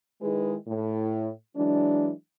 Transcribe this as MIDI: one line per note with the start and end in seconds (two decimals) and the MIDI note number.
0.21 0.55 51
0.21 0.55 56
0.21 0.55 63
0.21 0.55 64
0.21 0.55 68
0.21 0.55 71
0.68 1.30 45
1.56 2.10 52
1.56 2.10 54
1.56 2.10 56
1.56 2.10 62